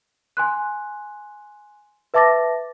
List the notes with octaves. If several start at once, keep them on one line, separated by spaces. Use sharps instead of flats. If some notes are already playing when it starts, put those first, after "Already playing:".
G#5 C6 F#6
B4 E5 A5 D6 A6 A#6